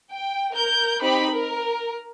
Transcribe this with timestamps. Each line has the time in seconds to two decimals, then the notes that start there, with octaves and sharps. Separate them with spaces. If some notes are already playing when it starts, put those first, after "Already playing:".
0.11 G5
0.55 A#4 G6
1.02 C4 D#4 G4 B5
1.32 A#4